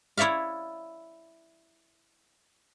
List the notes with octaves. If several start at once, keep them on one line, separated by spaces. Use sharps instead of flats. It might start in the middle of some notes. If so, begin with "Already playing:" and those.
E4 C#5 D5 E5 F5